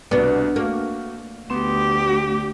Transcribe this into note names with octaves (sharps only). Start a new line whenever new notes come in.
C2 B2 B3 D4
A3 A#3 F#4
D2 B3 G4 C6 E7